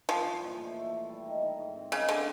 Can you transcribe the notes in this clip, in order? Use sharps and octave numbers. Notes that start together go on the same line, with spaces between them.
G2 F3
E3
A#2
A3
A3
A3
G3
D#3
D#3
G#2
C4
C#3 G#3
D3 C4